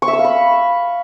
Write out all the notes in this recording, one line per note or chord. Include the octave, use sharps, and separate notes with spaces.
C#6
E5
E6
F5
B5